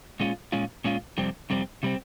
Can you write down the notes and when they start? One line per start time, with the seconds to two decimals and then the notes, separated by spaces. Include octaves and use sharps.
0.20 A#2 G#3 C#4 F4
0.52 A#2 G#3 C#4 F4
0.85 A#2 G#3 C#4 F4
1.18 F2 C3 G3 C4
1.50 F2 C3 G3 C4
1.83 C3 G3 C4